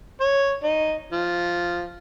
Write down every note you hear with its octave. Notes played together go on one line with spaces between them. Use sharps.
C#5
D#4
F3